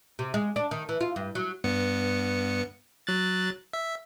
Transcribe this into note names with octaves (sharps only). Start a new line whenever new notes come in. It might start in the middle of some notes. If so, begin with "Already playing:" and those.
C3
G#3
D4
D#3
E3
F4
G2
F#3
G2 B3 C#7
F#3 F#6 A6
E5